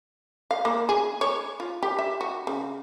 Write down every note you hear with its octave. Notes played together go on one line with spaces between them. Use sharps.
F5
A#3
G#4
C#5
F4
G4
E5
F#4
C#3